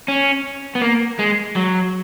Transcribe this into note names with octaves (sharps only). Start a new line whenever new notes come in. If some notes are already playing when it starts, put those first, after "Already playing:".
C#4
B3
A#3
G#3
F#3